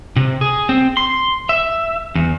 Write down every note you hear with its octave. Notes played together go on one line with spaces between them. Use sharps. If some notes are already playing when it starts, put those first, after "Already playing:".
C3
G#4
C4
C6
E5
E2